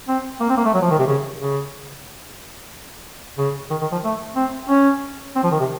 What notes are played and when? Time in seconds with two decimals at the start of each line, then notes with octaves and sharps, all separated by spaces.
0.08 C4
0.41 A#3
0.49 C4
0.57 A#3
0.65 A3
0.74 F#3
0.82 F3
0.91 D#3
0.99 C3
1.07 C#3
1.39 C#3
3.38 C#3
3.71 D#3
3.82 D#3
3.92 F3
4.04 A3
4.36 C4
4.69 C#4
5.36 C4
5.43 F3
5.51 D#3
5.60 C3